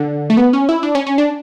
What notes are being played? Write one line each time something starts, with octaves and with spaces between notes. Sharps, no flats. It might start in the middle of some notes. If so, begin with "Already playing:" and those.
Already playing: D3
A3
B3
C#4
E4
D4
C#4
C#4
D4